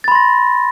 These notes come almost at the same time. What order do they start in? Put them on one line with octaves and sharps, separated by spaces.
A6 B5 C6 A#6